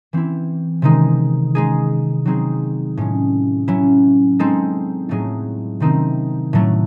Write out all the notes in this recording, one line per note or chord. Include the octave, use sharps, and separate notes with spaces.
E3 C4 E4
C3 D#3 G#3 D#4
G#3 D#4 G#4
F#3 C4 D#4 G#4
A2 G#3 C#4
F#3 C#4 E4
G#3 C4 D#4 A4
A2 F#3 A3 D#4 G#4
C3 D#3 A3 C4 D#4
A2 F#3 A3